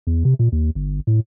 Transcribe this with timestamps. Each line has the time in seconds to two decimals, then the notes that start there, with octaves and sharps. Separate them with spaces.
0.07 E2
0.25 C3
0.39 A#2
0.52 D#2
0.75 G1
1.07 A2